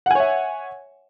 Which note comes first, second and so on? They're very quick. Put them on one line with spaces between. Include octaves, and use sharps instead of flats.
F#5 G#5 C#5 E5